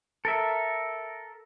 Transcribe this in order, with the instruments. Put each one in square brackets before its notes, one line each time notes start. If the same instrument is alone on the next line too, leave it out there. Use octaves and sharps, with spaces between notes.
[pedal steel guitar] A4 A#4 E5